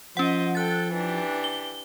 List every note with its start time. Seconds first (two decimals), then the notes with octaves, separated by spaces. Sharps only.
0.17 F3 C#4 C5 D#5 F#5
0.55 A4 G5 F#6 A6
0.93 E3 D4 G4
1.44 G7